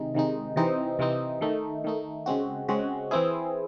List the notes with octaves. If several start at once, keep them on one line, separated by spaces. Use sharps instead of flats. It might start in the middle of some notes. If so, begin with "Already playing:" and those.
Already playing: C3 D#3 G#3 D#4
C3 D#3 G#3 D#4
C3 E3 C4 D#4
C3 E3 C4 D#4
D#3 A3 D#4
D#3 A3 D#4
C#3 G#3 C4 F#4
C#3 G#3 C4 F#4
E3 C4 E4 G#4